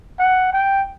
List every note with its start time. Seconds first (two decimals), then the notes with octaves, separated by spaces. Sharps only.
0.19 F#5
0.53 G5